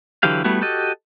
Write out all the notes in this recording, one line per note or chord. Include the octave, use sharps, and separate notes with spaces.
D3 E3 F#3 G4 F5
G3 A3 B3 E4 F#4
F#4 G4 A4 D#5